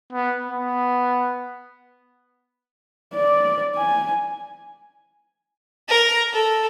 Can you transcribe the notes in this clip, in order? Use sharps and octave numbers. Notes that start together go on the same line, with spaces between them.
B3
B3
D5
G#5
A#4
A4